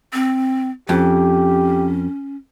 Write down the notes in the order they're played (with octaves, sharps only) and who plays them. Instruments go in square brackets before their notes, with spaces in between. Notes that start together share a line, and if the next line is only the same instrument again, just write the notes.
[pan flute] C4
[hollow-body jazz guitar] F2 [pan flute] C#4 [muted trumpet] G4